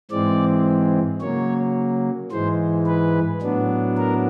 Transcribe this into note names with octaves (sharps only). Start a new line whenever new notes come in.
G#2 E3 G#3 C4 D5
C#3 F#3 A#3 C#5
G#2 E3 G#3 C5
B4
A2 F#3 B3 D4
A#4